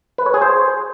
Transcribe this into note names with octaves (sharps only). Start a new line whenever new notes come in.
B4
C#5
G#4
C5